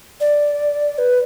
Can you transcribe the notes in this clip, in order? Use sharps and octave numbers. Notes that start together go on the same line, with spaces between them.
D5
B4